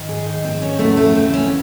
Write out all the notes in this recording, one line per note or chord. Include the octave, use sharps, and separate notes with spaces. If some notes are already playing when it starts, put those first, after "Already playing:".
Already playing: G#2 D#3
G#4
D#4
C4
C#4
E2 C#3 E3 A3
A3
C4
C#4